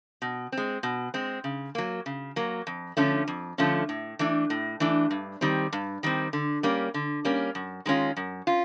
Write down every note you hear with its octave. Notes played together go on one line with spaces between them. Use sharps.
B2
C4
G#3
B2
G#3 C4
C#3
F#3 A#3
C#3
F#3 A#3
F2
D3 F3 A3 C#4
F2
D3 F3 A3 C#4
A2
E3 A3 D4
A2
E3 A3 D4
G2
D#3 G3 C4
G2
D#3 G3 C4
D3
G3 A#3 C#4
D3
G3 A#3 C#4
F#2
D#3 G#3 C#4 F4
F#2
C#4 F4